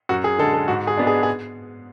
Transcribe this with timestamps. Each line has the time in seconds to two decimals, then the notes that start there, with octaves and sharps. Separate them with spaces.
0.09 F#2 F#4
0.24 G#4
0.39 D3 G#3 A4
0.53 A4
0.68 G#2 F#4
0.87 G#4
0.97 G#3 B3 D4
1.07 G#4
1.23 G#4